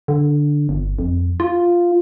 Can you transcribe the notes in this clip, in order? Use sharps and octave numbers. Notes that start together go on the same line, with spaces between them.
D3
G1
F2
F4